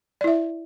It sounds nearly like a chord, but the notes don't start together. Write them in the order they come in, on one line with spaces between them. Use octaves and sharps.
D5 E4 E5